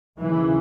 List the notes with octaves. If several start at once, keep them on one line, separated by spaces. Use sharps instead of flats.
D#2 C#3 E3